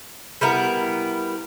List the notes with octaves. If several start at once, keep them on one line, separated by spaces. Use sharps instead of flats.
G3 B3 E4 A#4